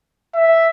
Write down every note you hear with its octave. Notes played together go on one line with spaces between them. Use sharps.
E5